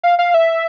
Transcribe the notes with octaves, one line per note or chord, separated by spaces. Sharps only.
F5
F5
E5